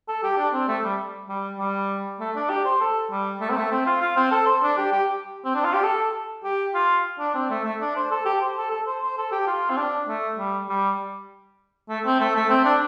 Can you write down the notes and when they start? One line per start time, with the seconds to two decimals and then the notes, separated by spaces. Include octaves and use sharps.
0.08 A4
0.23 G4
0.38 D4
0.53 C4
0.68 A3
0.84 G3
1.29 G3
1.59 G3
2.20 A3
2.36 D4
2.50 G4
2.65 C5
2.80 A4
3.11 G3
3.41 A3
3.50 C4
3.57 A3
3.72 C4
3.86 F4
4.02 F4
4.16 C4
4.31 A4
4.47 C5
4.63 D4
4.78 G4
4.92 G4
5.45 C4
5.55 D4
5.64 F4
5.74 G4
5.84 A4
6.44 G4
6.75 F4
7.19 D4
7.35 C4
7.50 A3
7.65 A3
7.81 D4
7.96 C5
8.11 A4
8.26 G4
8.41 C5
8.57 A4
8.71 A4
8.87 C5
9.02 C5
9.17 A4
9.32 G4
9.47 F4
9.70 C4
9.77 D4
10.08 A3
10.38 G3
10.69 G3
11.89 A3
12.05 C4
12.20 A3
12.36 A3
12.50 C4
12.65 D4